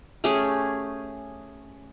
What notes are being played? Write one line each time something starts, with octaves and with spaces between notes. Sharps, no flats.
A3 C#4 G4 G#4